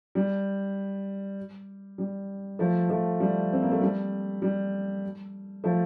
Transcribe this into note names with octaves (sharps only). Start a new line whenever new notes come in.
G3
G3
F3 A3
F3 A3
G3
C4
A#3
A3
G3
G3
F3 A3